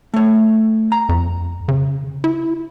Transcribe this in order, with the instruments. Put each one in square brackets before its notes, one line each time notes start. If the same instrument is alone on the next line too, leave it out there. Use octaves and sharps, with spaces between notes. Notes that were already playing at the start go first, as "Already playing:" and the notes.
[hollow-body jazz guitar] A3 C#5
A#5
[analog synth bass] F2
C#3
E4